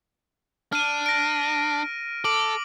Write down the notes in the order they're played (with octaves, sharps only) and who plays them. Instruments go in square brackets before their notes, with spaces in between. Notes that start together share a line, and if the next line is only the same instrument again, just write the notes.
[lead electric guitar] D4 [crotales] F6 D#7
[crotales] A#6 D7
[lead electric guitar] A4 [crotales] D6 D7 F#7